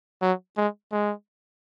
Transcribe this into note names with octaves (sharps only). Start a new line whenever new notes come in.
F#3
G#3
G#3